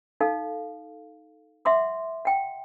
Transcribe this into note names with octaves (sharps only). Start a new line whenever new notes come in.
D#4 A4 F5
E5 F#5 C6 D6
F#5 G5